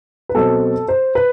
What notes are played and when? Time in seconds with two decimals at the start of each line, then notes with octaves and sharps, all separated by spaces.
0.29 B4
0.34 B2 F#3 C4 A4
0.88 C5
1.15 B4